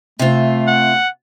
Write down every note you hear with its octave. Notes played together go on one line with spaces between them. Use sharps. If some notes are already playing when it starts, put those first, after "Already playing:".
C3 A3 F4
F#5